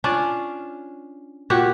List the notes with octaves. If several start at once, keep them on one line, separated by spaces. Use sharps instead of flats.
C#4 D4 F4
A#2 F#4 G4 C#5